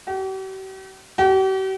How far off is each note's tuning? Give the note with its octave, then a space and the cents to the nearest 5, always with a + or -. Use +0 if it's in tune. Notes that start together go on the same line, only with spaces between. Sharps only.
G4 -45
G4 -45